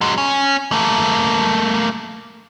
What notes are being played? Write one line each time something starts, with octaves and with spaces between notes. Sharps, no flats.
F#3 G#3
C#4
A3 A#3